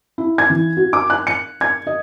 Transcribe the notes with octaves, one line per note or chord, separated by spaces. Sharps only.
E4
G#6
E3
F#4
D6
F#6
C#7
G#6
D#5